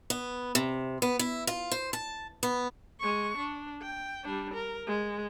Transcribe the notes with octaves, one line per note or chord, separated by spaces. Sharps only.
B3
C3
B3
E4
F4
C5
A5
B3
G#3 C#6
D4
G5
G3 D4
A#4
G#3